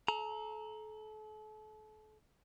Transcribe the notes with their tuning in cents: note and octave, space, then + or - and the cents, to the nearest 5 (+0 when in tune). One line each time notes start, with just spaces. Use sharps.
A4 -35 A#5 +0